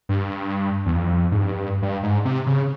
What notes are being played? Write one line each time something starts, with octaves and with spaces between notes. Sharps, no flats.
G2
E2
F2
G#2
G2
G2
G#2
C3
C#3